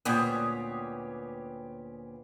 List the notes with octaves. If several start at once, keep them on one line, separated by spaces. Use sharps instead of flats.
D2 A#2 B3 C#4 G4 G#4